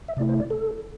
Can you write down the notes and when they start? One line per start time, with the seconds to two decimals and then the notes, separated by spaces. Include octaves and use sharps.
0.08 E5
0.17 C3 A3 E4 D5
0.29 C5
0.40 D5
0.50 A4